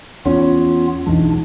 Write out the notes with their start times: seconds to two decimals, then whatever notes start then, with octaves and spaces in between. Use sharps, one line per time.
0.26 E2 B3 C#4 F4
1.07 B1 E2 E3 G#3 D4 D#4